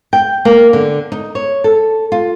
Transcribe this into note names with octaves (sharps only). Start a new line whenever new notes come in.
G5
A#3
D3
D#4
C#5
A4
F4